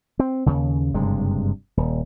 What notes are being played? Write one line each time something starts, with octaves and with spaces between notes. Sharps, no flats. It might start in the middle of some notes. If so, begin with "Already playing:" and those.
C4
D#2 C#3
F#1 G2 C3 G#3
D#1